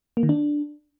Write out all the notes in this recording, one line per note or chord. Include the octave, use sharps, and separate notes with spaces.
A#3
D#3
D4